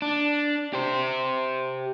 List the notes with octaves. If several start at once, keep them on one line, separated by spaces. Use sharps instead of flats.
D4
G4 C5